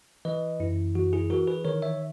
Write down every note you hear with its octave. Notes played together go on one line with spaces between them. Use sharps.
E3 B4 D#5
F#2 E4
E3 F#4
E4 G#4
E3 F#4 A#4
G#4 B4
D#3 A#4 C#5
C#5 E5